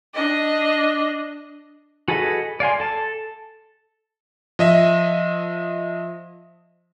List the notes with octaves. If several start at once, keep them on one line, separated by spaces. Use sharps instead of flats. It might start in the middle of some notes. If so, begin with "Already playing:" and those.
D4 D#5
F#4 G#4 A4 B4 D#5
D5 F5 G#5 C6
A4 A5
F3 D#5 E5